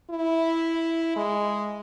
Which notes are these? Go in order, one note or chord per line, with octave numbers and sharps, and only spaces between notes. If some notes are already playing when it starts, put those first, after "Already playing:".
E4
G#3